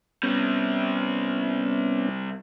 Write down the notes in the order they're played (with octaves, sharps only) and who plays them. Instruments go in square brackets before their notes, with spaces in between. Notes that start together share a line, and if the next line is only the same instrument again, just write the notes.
[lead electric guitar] C3 G3 [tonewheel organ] B3 C#4